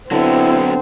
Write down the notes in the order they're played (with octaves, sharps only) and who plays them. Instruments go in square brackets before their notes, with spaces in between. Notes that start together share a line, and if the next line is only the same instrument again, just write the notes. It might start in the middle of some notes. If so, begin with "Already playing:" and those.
[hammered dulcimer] D3 [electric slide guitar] F#3 B3 [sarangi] C4 [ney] E4